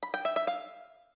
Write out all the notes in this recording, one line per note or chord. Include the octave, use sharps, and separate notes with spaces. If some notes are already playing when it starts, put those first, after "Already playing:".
B5
G5
E5
E5
F5